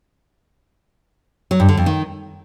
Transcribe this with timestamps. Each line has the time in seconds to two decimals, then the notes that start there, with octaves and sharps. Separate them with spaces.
1.51 F#3
1.60 G2
1.69 D3
1.77 F2
1.86 D#3